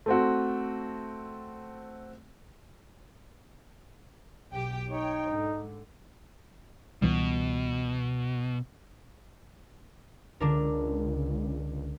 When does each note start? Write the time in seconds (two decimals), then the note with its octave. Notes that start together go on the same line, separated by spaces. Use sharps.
0.06 A3 C4 F#4
4.54 B1 G4 G5
4.90 D#4 C#5 G5
5.29 G#2 D3
7.02 C#2 B2 E3 G3
10.40 C#2 D3 D4 A#4